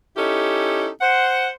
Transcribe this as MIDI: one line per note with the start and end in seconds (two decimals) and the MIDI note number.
0.17 0.89 61
0.17 0.89 63
0.17 0.89 64
0.17 0.89 67
0.17 0.89 69
1.01 1.51 72
1.01 1.51 78